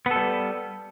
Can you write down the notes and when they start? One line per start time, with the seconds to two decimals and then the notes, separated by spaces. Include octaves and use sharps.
0.06 B3
0.11 A4
0.16 G3